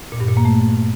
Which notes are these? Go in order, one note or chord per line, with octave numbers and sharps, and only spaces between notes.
A#2
G2
A#2
A#3
A3